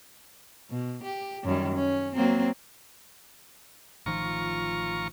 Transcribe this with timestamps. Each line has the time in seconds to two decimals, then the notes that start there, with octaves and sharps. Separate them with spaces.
0.70 B2
1.03 G4
1.44 F#2 D#3 G3
1.75 C#4
2.15 F#3 A#3 C4
4.06 A1 D#3 F3 F4 A#5 C#6